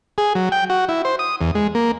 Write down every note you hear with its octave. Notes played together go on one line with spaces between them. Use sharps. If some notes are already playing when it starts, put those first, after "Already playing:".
G#4
F#3
G5
F#4
E4
C5
D#6
E2
G#3
A#3